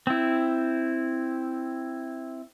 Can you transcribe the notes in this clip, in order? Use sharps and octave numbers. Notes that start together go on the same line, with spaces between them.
C4 E4